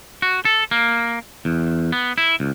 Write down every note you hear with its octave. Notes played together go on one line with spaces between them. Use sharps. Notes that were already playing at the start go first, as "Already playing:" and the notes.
F#4
A4
A#3
E2
B3
E4
C#2